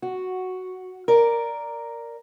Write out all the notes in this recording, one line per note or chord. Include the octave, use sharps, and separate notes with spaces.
F#4
A#4 D5